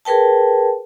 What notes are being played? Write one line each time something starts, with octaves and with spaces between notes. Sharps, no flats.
G#4 A#4 B4 G5 A5